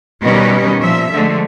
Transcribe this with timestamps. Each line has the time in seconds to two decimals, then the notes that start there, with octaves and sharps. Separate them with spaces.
0.22 B2 D#3 G3 C#4 B4 D#5
0.79 A#2 F3 E5
1.12 D3 F3 G#3 A3